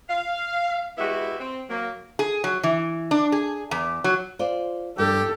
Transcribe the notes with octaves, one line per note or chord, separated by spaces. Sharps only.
F5
G#3 B3 E4 F#4 G4 E5
C4
F#3 A#3
G#4
F#3
E3
D4
G#4
E2
F#3
F4 C5 D5
G2 G4 A4